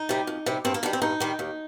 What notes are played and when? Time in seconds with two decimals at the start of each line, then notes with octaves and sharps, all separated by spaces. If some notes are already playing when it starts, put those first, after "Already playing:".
Already playing: D#4
0.09 C3 G3
0.27 F2
0.46 C3 G3
0.65 G2 C4
0.74 A#3
0.83 D#3 G3 D4
0.93 C4
1.02 G2 D#4
1.20 D#3 G3
1.39 D#2